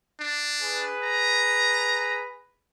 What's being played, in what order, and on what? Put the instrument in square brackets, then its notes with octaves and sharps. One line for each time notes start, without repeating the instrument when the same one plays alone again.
[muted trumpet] D4
[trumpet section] G#4 B4
[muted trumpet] A#5